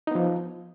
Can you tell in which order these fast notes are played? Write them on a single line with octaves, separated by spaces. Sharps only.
D#4 B3 F3